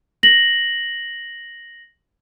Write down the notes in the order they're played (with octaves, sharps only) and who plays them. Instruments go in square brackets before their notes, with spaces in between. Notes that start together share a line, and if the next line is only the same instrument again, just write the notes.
[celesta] A#6 F#7